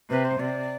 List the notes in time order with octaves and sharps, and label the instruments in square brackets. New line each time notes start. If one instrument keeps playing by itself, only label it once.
[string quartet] C3 [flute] B4
[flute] C5
[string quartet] C3 [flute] D5